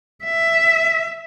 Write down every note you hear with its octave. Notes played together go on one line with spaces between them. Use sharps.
E5